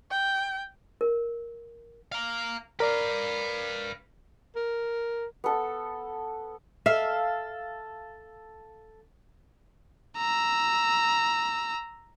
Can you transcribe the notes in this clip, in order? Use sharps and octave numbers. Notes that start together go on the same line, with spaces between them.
G5
A#4
F5 A#5
A#4 B4 D5 F5
A#4
B3 A4
A4 E5 F5
A#5 E6